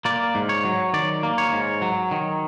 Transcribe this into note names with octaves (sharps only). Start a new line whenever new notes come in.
A#3 D5
G#2
C#5
F#3
D#3 D5
A#3
C#5
G#2
F#3
D#3